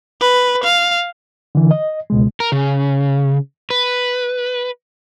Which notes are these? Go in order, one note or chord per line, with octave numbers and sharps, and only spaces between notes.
B4
F5
D3 E3
D#5
C#2 B2 G#3
A#4
C#3
B4